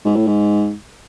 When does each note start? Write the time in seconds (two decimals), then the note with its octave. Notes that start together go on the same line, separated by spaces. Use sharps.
0.05 G#2
0.16 A2
0.27 G#2